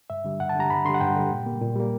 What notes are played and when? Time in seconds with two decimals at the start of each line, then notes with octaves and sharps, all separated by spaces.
0.10 G2 E5
0.25 D3 G3
0.39 G2 F#5
0.49 A5
0.55 D3 G3 A#5
0.70 G2 B5
0.85 D3 G3 C6
0.94 F#5
1.00 G2 G5
1.16 D3 G3
1.31 A#2
1.46 G3 A#3
1.61 A#2
1.76 G3 A#3